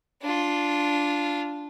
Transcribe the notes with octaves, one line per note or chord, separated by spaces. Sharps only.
D4 F4